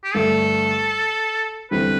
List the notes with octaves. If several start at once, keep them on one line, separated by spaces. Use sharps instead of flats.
G4
G2 D3 A3 A4
E2 D3 G3 C4 B4